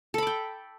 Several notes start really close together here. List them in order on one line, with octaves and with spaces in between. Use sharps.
A4 B5 D6 G5